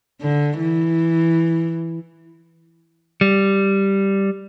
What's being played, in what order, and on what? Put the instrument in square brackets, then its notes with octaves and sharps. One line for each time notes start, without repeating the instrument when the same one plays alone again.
[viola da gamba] D3
E3
[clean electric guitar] G3